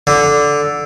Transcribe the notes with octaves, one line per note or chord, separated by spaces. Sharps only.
D3